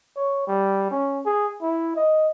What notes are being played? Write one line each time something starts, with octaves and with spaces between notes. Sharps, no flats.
C#5
G3
C#4
G#4
E4
D#5